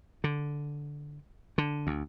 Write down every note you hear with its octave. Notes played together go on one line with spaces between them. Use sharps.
D3
D3
D2